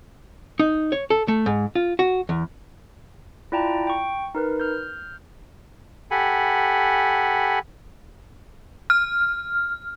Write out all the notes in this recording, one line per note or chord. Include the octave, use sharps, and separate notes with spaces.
D#4
C#5
A4
A3
G#2
F4
F#4
E2
E4 F4 D5 G5 A5 A#5
G5 C#6
D#4 A#4 B4
F6 G6
G4 A4 F#5 G#5 B5
F6